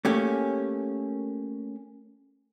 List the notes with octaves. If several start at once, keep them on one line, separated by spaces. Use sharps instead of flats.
A3 A#3 C#4 G4